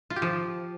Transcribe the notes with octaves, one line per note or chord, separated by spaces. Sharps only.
F4
G4
F3